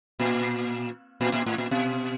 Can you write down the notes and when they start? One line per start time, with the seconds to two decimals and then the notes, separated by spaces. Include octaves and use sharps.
0.20 A#2
1.21 A#2
1.34 A#2
1.46 A2
1.58 A#2
1.71 B2